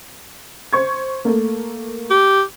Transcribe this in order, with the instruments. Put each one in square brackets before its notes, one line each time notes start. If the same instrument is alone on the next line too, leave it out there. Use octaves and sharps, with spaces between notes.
[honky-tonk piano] C5 C#6 G#6
A3 A#3
[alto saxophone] G4